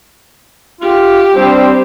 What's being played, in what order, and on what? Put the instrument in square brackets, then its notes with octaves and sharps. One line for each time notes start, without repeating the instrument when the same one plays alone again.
[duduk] F4 [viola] G4
[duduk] G3 [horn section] C4 D4 C5